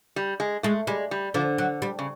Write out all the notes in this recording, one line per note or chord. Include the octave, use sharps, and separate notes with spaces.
G3
G#3
G#3 A3
G3 G#3
G3
D3 F3
F#3
G3
C#3